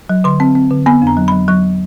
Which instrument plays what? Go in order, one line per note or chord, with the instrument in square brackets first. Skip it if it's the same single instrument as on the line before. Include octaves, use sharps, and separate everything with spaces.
[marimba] F#3
D3 C6
C4
C4
D3
B3 B5
F2
A#5
F#3
F#3 B5
F#3 C#6